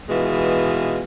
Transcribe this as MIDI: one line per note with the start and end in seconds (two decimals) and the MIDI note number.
0.09 1.03 47
0.09 1.03 52
0.09 1.03 56
0.09 1.03 65